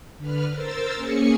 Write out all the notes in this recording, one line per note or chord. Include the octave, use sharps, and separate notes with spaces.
D3 B4 F6
A#4 C5 E6 A6
A#3 C#4 G#4 G#5 C#7